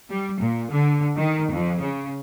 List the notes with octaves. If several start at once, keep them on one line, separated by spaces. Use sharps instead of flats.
G3
A#2
D3
D#3
F2
C#3